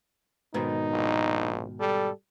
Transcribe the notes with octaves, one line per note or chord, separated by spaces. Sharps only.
G#2 B2 D#3 D#4
A#1
G3 A4